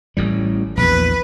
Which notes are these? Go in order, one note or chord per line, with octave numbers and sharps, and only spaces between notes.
A1 A2 G3
A#1 E2 B4